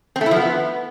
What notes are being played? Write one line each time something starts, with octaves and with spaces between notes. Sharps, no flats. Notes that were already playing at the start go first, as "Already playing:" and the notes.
C4
A3
E4
F3
B3